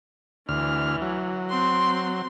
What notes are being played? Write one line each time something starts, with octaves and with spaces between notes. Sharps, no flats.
D2 E3 F6
F#3
C4 C6